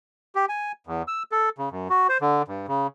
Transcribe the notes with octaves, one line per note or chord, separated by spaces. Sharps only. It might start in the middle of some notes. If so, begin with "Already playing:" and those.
G4
G#5
E2
E6
A4
C#3
F#2
F#4
C5
D3
G2
C#3